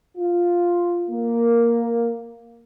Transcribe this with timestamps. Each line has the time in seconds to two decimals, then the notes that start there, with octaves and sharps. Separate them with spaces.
0.17 F4
1.09 A#3